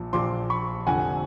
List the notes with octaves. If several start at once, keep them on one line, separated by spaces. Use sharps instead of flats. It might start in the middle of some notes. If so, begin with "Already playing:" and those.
Already playing: A#1 A#2 F3
A#1 A#2 F3 C6 D6
B5 C#6
F1 F2 D3 F3 F#5 G#5